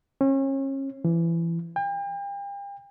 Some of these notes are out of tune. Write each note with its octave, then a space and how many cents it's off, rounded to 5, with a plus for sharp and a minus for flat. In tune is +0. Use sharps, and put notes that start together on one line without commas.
C#4 -35
E3 +25
G5 +40